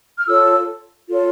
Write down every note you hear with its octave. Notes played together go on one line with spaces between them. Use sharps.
F6
F4 A4 C#5 E6
F4 A4 C#5